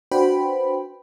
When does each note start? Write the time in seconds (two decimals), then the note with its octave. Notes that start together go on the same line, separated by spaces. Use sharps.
0.11 D4 F#4 B4 C5 G5 B5